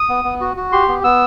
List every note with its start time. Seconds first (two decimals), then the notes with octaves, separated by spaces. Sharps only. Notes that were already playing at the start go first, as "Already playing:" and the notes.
Already playing: D#6
0.09 B3
0.25 B3
0.40 F#4
0.57 F#4
0.72 G4 C6
0.88 B3
1.04 B3 E6